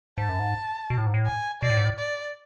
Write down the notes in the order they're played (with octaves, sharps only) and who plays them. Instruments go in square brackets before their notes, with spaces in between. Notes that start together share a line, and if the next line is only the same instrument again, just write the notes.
[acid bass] G#2 [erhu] A5
[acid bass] F#2
G#2
B2
A2
G#2
A2
[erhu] G#5
[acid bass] B2 [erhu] D5
[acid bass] A2
G#2
A2
[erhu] D5